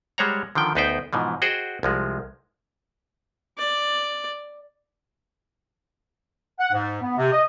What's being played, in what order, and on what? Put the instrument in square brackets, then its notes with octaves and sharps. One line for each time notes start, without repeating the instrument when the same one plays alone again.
[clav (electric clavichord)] G3 G#3 C5 C#5 F#5 A#5
D3 D#3 F3 G5
D2 B3 D#4 B4 C5 G5
G#2 B2 E3 F3
F#4 G#4 C5 D#5 F#5 G5
C2 F3 G#3
[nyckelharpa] D5
[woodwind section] F#5
G#2
B3
C3
D#5